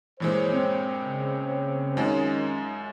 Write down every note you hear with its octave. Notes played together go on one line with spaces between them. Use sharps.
G2 A#2 E3 G#3 C5 C#5
C4
C#3
F#2 D#3 G#3 C#4 D#4 F4